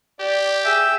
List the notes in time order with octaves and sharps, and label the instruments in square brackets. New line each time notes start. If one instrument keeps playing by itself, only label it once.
[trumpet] G4 [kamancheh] D5
[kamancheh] G#4 [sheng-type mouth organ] E5 G5